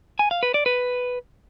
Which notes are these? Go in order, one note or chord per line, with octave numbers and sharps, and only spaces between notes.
G#5
F5
B4
D5
B4